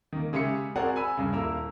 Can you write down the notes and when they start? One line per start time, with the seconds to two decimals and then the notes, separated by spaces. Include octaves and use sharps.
0.12 D#3 A#3
0.33 C#3 G#3 G4 E5 C#7
0.76 C4 F#4 G#4 A#4 D5 F#5
0.96 G#5 B5 E6 D#7
1.17 G2 C#3
1.32 D#1 A#3 E4 A#4 E6